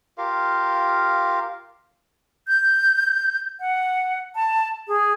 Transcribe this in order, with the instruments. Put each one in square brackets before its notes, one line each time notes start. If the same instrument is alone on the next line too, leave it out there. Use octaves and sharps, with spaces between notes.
[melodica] F4 G4 A#4 F5
[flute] G6
F#5
A5
G#4